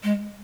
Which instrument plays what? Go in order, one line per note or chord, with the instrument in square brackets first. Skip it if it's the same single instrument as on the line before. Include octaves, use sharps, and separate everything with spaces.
[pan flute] G#3